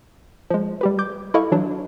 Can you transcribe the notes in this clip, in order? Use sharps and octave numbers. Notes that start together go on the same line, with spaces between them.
F3 G#3
G3 G4 B4
D6 G6
E4 A4 D#5 F5 C#6
E3 F#3 D4